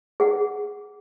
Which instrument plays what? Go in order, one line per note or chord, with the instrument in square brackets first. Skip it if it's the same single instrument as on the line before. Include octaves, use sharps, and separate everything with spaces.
[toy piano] G#4 F#5